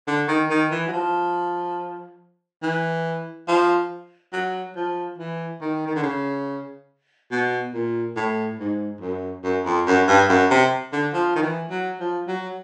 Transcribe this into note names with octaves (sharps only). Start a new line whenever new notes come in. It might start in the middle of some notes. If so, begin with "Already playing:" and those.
D3
D#3
D#3
E3
F#3
F3
E3
F3
F#3
F3
E3
D#3
D#3
D3
C#3
B2
A#2
A2
G#2
F#2
F#2
F2
F#2
G2
F#2
C3
D3
F3
D#3
E3
F#3
F3
F#3